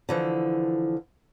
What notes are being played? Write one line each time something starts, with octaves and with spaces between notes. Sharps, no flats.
D3 E3 F3